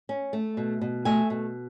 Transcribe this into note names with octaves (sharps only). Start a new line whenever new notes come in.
C#4
A3
B2
B2
A3 E5 G#5
B2